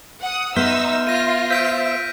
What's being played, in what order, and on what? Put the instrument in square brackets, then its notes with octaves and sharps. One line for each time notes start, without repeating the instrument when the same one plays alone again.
[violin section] F#5 D#6
[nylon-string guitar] B3 [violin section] D#4 E6 [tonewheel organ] E5 C6 [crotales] F6 G6
[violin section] F4 [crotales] A#6 D#7
[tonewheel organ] C5 E5 E6 [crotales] G6 B6 D7